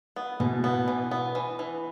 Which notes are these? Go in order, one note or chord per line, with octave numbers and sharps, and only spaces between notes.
B3
B2 E3
B3
E3
B3
E3
E3